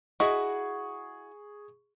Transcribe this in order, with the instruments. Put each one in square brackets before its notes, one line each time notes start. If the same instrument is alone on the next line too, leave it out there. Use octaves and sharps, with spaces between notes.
[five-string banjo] E4 F#4 D#5 [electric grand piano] G#4 C#6